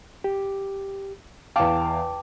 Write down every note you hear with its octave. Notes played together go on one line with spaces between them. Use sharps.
G4
E2 F5 G5 A5 D6